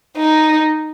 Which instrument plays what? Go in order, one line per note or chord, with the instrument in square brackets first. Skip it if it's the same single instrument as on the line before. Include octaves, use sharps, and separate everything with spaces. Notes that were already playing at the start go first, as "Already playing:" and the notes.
[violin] D#4